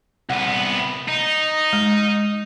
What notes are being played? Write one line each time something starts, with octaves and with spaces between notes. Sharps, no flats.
C2 B3 F#5
D#4
G#3